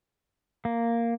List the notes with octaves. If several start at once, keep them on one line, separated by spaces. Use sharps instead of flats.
A#3